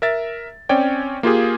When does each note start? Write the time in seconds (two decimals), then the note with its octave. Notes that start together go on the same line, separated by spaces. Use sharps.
0.02 A#4 E5 A6
0.69 C4 C#4 C#5 D5 G5
1.23 A#3 F4 G4 G#4